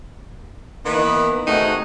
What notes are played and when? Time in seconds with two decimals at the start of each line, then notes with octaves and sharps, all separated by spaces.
0.86 D#3 E3 A#3 B3 B4
1.47 C3 D#3 A3 D#4 F#4 G#4